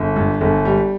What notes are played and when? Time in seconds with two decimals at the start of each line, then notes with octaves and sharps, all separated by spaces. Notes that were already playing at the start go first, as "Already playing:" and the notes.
Already playing: G1
0.16 G2
0.41 G1
0.65 G3